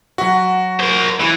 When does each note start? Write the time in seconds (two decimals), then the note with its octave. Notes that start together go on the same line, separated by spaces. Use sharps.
0.18 F#3 F#4 E5
0.80 A#4 C5
1.20 E3 E4 C#5